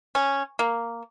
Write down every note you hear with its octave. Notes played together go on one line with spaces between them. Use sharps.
C#4
A#3